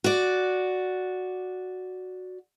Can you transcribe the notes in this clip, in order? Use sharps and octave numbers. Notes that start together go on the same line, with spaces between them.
F#4 D5